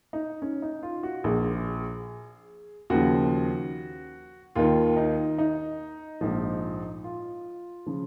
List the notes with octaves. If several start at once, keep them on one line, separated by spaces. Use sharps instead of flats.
D#4
C#4
D#4
F4
F#4
A#1 A#2 F3 G#4
D#2 C#3 F3 F#4
D#2 D#3 F4
D#4
D#4
A#1 G#2 F3
F4
C#3 F3